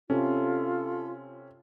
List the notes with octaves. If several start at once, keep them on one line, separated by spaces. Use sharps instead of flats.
C3 C#4 F4 A4